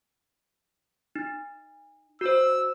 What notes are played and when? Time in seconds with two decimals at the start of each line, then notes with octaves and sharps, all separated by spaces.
1.16 D#4
2.21 F#4 C5 E6